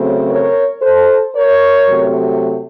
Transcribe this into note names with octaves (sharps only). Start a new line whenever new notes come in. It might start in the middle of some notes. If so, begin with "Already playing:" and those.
Already playing: C#3 F#3 A3 C4
A#4 C#5
A4 C5
A#4 C#5
C3 F#3 A3